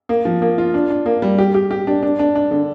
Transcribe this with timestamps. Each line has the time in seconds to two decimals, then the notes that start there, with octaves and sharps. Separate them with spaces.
0.09 A#3
0.25 F3
0.42 A#3
0.58 F4
0.74 D4
0.90 D4
1.06 A#3
1.22 G3
1.38 G4
1.54 G4
1.71 G4
1.87 D4
2.03 D4
2.19 D4
2.35 D4
2.51 D3